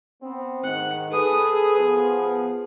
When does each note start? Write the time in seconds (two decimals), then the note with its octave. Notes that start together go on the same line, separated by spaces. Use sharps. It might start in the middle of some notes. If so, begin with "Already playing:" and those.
0.23 B3 C4
0.64 G#2 D#3 F#5
1.11 G#4 A4 B4 D#6
1.44 G#4
1.78 F3 B3